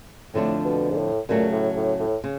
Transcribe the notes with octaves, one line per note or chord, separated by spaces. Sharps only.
F2 A2 D3 F3 A3 D4
B2
G#2
A2
A#2 C#3 F#3 A3
A2
A2
A2
C#3